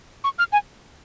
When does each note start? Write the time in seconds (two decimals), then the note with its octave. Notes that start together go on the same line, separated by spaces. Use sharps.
0.24 C#6
0.39 F6
0.53 G#5